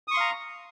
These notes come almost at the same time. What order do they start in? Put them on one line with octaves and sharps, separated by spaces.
D#6 C#6 C6 F5 A#5